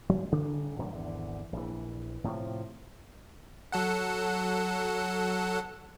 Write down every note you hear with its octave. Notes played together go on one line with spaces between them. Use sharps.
F#3
A1 C#3 G3 D4
A2 D3 F#3 G3
G#1 E2 D3
A#1 E3
A2 C3 E3 F3
F#3 A4 F#5